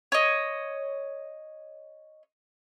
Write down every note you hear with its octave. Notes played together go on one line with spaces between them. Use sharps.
C#5 D#5